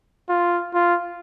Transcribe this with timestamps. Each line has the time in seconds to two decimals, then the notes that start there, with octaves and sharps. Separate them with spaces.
0.29 F4
0.74 F4